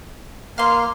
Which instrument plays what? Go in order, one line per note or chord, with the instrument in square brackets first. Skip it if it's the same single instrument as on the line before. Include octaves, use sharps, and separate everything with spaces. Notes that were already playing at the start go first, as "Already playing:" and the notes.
[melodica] A#3 [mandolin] F5 C6